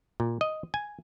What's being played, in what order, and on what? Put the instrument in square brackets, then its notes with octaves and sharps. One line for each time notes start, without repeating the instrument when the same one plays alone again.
[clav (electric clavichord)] A#2
D#5
G#5